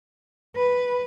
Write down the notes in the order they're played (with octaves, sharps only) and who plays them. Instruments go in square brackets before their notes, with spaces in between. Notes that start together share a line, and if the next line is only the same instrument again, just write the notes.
[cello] B4